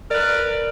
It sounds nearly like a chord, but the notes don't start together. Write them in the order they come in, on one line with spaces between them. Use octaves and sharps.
A#4 D5 B4